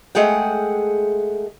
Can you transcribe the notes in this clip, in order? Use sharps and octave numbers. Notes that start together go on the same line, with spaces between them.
G#3 A3 G#4 F#5 G5